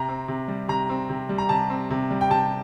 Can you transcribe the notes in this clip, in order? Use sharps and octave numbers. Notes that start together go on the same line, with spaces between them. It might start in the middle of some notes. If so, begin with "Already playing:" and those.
Already playing: C3 A#5
C4
C3
G3
C3 A#5
C4
C3
G3
A#5
C3 A5
C4
C3
G3
G5
C3 A5